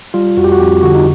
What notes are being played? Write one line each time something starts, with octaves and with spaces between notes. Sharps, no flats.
G3 F4
F2 F#4
G4
F#4
F2 G4
D3 F#4
D#4